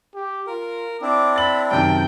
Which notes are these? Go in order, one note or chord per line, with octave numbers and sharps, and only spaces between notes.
G4
F4 A#4
C4 D4 E4 D6
B5 A6 F#7
F#2 C3 D#3 G5 A5